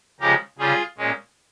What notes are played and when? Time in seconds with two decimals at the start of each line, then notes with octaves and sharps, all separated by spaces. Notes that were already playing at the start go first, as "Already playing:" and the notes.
0.20 C#3 F3 G#3 G4 A#4
0.59 C#3 G3 C#4 F4 G#4
0.98 A#2 G#3 C#4